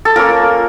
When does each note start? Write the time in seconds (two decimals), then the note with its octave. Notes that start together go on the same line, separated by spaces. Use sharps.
0.05 A4
0.16 A#3 C#4 F4 A#4